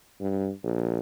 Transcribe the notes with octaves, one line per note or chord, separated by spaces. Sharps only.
G2
A#1